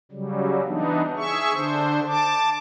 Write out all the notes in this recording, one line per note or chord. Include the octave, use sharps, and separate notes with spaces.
C#3 F#3 G3
E3 B3 D4 D#4
G#4 E5 C#6
D3 D4 C5
A5 D6